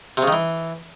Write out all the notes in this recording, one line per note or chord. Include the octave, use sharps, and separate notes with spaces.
C3
C#3
D#3
E3